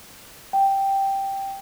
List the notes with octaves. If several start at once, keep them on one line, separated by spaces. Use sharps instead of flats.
G5